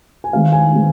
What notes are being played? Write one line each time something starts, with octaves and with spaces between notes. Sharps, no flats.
G#5
D#3 G#3 C4 F5
G#5
D#3 G#3 C4